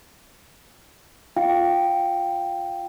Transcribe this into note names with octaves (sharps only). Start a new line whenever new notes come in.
F4 F5 G5